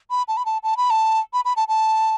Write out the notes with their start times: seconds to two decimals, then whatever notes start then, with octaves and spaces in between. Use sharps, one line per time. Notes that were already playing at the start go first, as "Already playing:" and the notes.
0.11 B5
0.28 A5
0.37 B5
0.46 A5
0.63 A5
0.77 B5
0.90 A5
1.33 B5
1.45 B5
1.56 A5
1.68 A5